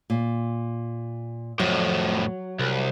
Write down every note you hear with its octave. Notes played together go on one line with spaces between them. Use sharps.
A#2
F2 A2 F#3
C2